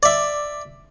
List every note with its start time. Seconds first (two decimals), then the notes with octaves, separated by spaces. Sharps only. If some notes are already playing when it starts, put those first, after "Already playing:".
0.03 D5 E5